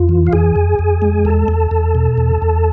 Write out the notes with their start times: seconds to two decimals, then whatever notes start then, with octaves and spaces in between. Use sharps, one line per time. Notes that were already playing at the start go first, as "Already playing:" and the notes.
Already playing: F2 F4
0.09 E3
0.27 F5
0.33 F2 G#4 G#5
0.56 F2
0.79 F2
1.02 G#3
1.25 E2 A4 A5
1.48 E2
1.71 E2
1.95 B2
2.18 E2
2.42 E2